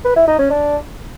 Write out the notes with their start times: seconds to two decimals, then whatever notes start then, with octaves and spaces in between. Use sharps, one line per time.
0.05 B4
0.16 E4
0.27 D#4
0.39 C#4
0.50 D4